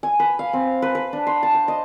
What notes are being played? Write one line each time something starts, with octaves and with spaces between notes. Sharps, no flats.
G#5
B4
F5
C4
B4
B4
D4
C6
A5
C5
D#5